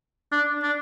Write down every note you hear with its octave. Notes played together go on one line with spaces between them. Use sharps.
D4
D4